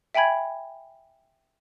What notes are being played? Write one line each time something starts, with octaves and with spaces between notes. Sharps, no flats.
E5 G5 G#5 B5 G#6